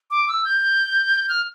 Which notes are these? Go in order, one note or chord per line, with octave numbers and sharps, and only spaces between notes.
D6
E6
G6
F6